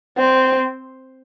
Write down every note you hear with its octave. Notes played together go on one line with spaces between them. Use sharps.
C4